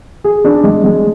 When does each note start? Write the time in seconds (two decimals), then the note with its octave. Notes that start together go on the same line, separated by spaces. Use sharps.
0.24 G#4
0.45 D4
0.64 G#3
0.84 G#3